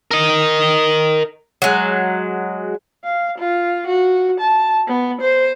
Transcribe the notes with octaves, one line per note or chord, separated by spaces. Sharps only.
A#4 D#5
F#3 G#3
F5
F4
F#4
A5
B3
C5